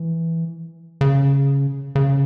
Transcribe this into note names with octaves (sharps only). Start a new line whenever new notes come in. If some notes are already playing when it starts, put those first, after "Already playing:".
Already playing: E3
C#3
C#3